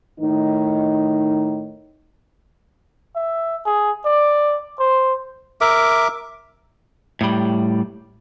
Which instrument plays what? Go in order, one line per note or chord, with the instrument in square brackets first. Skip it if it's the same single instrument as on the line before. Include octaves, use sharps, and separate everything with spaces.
[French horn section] A2 D#3 D#4
[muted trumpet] E5
G#4
D5
C5
[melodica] A#4 E5 D6
[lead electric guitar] A2 G3